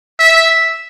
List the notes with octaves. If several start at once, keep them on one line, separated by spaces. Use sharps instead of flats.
E5